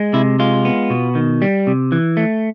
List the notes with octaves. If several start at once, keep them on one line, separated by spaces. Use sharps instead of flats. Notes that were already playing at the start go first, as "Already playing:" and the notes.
Already playing: G#3
C3 E4
G#3 F4
B3
B2
D#3
G3
C3
E3
A3